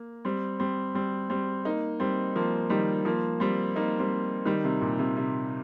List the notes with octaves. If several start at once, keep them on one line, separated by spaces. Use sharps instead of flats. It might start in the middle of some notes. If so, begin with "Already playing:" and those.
Already playing: A#3
G3 C4
G3 C4
G3 C4
G3 C4
A#3 D#4
G3 C4
F3 A#3
D#3 G3
F3 A#3
G3 C4
A#3 D#4
G3 C4
D#3 G3
C3
A#2
C3
C3